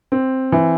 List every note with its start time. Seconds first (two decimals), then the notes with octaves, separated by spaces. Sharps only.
0.12 C4
0.52 E3